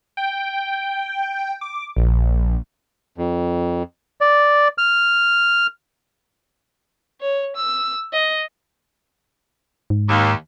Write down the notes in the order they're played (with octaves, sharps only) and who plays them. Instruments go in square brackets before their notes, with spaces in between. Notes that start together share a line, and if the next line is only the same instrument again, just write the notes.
[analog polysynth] G5
D6
A#1
[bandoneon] F2
D5
F6
[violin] C#5
E6
D#5
[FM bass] G#2
[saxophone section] D#2